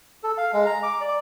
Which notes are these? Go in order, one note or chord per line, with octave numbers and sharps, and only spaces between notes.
A4
F5
G#3
A#5
D6
D5